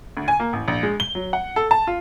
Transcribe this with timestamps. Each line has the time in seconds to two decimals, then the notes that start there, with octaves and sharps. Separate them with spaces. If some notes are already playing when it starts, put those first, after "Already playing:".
0.17 D2
0.28 G#5
0.40 A#3
0.53 A1
0.68 A#1
0.83 G#3
1.00 G7
1.15 F#3
1.33 F#5
1.56 A4
1.71 A5
1.87 F4